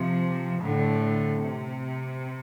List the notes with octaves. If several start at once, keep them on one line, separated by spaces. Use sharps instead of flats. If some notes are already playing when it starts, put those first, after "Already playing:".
Already playing: C3 F3
A2 D3
C3